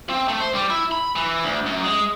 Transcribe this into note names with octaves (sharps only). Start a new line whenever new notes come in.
C4
A3
C5
G3
E4
B5
E3
D2
F#2
G#3